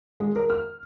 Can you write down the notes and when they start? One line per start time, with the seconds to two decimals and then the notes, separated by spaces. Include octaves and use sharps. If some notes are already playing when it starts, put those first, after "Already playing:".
0.20 G#3
0.36 A#4
0.50 F6